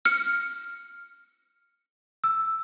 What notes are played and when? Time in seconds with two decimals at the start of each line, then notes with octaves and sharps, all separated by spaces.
0.05 F6 C#7
2.24 E6